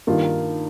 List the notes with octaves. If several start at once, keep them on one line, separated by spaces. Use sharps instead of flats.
G2 D#3 A#3 F4